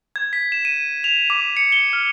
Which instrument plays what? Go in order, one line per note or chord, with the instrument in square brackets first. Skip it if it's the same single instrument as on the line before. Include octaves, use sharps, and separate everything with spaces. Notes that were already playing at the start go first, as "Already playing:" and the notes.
[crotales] G#6
B6
E7
D#7
F7
D6
C#7
G7
F6